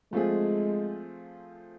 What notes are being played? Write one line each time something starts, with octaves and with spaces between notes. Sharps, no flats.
F3 G#3 A3 C4 F4 G#4